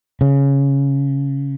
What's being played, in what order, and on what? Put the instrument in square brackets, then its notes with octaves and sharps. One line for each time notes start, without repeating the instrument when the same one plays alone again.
[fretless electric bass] C#3